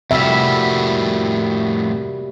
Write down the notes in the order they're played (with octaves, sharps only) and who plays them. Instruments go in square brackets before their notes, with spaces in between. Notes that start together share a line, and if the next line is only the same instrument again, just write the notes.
[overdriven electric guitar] F2 A2 [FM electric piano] C3 [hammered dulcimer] G3 A#3 F#4 [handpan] E5